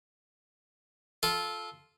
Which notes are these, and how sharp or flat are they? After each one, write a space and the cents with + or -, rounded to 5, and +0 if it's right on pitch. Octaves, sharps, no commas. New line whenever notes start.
F4 +0 A4 -15